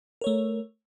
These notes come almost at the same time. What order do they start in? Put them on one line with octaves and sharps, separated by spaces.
A#4 C#5 A3